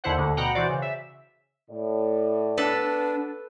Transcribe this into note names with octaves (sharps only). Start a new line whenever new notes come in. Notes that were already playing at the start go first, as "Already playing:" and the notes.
D#2 D3 E4 C5 F#5
D2 D3
B2 F#5 G5 A#5
E3 F#4 C5 D5
C#3
E5
A2 D5
B3 D4 A4 B4 A5